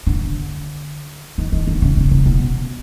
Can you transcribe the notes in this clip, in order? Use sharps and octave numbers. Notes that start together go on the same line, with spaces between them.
D3
D#3
D#3
D3
C#3
C#3
C#3
B2